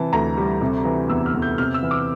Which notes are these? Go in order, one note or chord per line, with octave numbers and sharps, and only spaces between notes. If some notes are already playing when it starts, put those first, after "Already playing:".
Already playing: C3 E3 A5
D2 A#5
G3
C3
E3
E2 E6
F6
E2
G6
C3 F6
E6
E3
D6